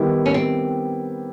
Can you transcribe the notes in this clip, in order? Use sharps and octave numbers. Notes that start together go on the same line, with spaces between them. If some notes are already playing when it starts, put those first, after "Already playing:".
Already playing: D#3 G3 B3 E4 G4
C#4
C4